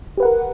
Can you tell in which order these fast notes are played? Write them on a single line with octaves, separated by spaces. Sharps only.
G4 B4 F#5 A#4